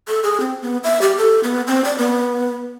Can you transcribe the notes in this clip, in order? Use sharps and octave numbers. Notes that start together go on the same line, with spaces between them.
A4
G#4
C4
B3
E5
G4
A4
B3
C4
D5
B3